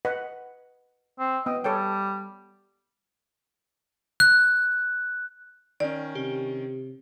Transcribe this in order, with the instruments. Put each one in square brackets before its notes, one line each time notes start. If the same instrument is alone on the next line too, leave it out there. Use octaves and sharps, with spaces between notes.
[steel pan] B4 D#5 F#5
[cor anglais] C4
[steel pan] B3 G5 [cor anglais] D#5
[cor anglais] G3 [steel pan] A4 C#5 G5
[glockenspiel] F#6
[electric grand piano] D#3 C#4 [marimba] D5
[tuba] C3 [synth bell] G4